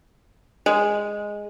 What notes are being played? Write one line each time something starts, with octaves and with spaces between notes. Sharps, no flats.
G#3